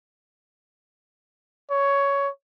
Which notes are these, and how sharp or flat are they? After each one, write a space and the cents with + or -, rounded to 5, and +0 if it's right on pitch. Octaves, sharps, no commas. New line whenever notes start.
C#5 +10